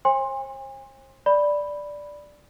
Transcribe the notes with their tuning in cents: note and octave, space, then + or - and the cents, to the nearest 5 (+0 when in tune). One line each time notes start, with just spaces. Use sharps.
C5 +45 G#5 -40 C6 +20
D5 +0 B5 +0